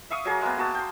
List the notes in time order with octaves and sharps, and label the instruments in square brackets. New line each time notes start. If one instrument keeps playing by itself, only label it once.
[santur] E5 F5 C#6 D#6
F#3 G#4 A#4 D6
G#3 A#3 B3
A#3 F#4 A5 D#6
G5 C6